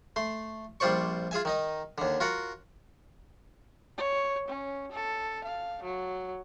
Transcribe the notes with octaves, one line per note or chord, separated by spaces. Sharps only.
A3 C6
A#1 G3 F4 C5 D5 C#6
F4 G#4 E5 G#5
D#3 D#4 D#5
D#2 D3
F4 F#4 A#4 F#5
C#5
C#4
A4
F5
F#3